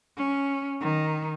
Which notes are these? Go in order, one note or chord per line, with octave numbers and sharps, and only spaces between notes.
C#4
D#3